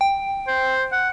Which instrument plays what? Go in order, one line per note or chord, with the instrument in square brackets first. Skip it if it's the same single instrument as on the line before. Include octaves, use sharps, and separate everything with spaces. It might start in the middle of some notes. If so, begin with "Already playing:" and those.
[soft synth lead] G5
[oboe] C5
F#5